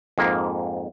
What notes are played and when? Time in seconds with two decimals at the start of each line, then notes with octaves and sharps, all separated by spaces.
0.18 F2 G#2 A#3